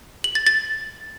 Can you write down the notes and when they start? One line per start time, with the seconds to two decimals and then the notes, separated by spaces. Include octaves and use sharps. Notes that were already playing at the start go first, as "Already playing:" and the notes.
0.24 F#7
0.35 A6
0.47 A6